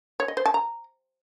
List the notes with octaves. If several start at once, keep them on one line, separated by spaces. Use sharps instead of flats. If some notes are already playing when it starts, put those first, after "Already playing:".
C#5
D#5
C5
A5
A#5